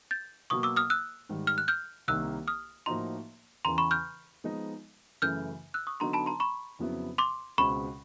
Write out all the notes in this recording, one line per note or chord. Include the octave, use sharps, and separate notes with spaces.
G6 A6
B2 F#3 A#3 C#6 D#6
D6 E6
D#6 F6
E6 F#6
G#2 D#3 G3
F6
F#6
F6 G6
C2 C3 D#3 G3 A#3 E6 F#6
D#6 F6
A2 F3 A#3 D#4 F#4 A#5 C6
E2 C#3 E3 A#5 C6
B5 C#6
F6 G6
F3 G#3 B3 D#4
F#2 C#3 E3 A3 F6 G6
E6 F#6
C#6 D#6
D3 F#3 B3 D#4 A#5 C6
A5 B5
A#5 C6
B5 C#6
F2 C#3 F#3 B3 E4
C6 D6
C#2 B2 G#3 C4 B5 C#6